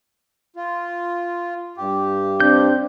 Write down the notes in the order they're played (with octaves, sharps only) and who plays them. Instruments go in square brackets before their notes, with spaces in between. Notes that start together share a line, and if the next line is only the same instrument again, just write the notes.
[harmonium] F4
G2 G4
[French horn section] C4 D4 [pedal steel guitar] G6